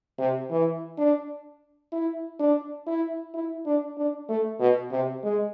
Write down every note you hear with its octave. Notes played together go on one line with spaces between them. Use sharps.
C3
E3
D4
E4
D4
E4
E4
D4
D4
A3
B2
C3
G#3